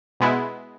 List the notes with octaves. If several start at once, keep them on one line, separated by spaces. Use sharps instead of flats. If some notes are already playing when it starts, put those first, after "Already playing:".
B2 G#3 B3 E4